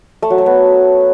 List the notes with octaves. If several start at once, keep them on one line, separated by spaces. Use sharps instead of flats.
A3
F#3
A3
B3